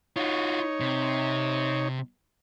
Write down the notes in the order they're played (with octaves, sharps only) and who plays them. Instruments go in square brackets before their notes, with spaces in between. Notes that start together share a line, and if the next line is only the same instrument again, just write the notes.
[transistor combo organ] D#4 C#5 [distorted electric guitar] F4 F#4
[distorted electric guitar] C3